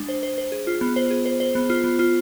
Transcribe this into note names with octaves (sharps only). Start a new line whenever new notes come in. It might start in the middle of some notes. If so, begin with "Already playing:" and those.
Already playing: G#3 D4
C5
C5
C5
G#4
F4
B3
C5
G#4
C5
C5
B3
F4
B3
F4